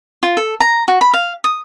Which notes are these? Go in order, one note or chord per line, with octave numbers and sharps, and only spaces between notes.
F4
A4
A#5
F#4
B5
F5
D#6